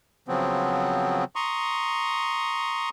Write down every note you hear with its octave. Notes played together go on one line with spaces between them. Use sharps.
C#3 F3 F#3 B3 C4
A#5 C6 C#6 D#6